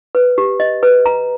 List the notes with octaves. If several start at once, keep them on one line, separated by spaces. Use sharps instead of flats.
B4
G4
D#5
B4
A#5